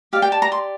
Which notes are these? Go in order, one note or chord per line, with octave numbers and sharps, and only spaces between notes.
G4 D5 F5
G5
A5
A#5
C6